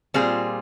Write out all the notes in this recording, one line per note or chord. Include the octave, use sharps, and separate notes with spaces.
A#2 G3 C4 F4 G#4